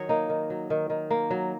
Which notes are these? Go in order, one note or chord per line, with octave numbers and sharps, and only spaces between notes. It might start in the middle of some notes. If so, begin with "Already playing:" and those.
Already playing: D#3 F#3 C#5 D#5
A#3 D#4
D#3
F#3
D#3
D#3
A#3
F#3